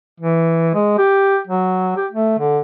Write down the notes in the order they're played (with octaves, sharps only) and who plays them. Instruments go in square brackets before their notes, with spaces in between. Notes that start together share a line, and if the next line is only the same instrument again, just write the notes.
[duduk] E3
G#3
G4
F#3
G4
A3
D3